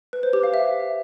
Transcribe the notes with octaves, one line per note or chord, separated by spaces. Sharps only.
B4
C5
G4
F5
E5